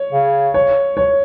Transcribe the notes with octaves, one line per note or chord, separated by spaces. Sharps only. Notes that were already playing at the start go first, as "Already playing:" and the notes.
Already playing: C#5
C#3
C#5
C#5